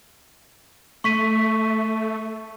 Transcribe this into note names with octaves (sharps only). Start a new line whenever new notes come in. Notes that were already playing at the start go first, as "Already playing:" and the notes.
A3 C#6 B6 D#7